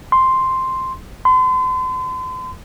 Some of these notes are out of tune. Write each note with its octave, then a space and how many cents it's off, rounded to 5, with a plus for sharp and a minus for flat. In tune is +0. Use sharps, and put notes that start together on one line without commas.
C6 +0
C6 -40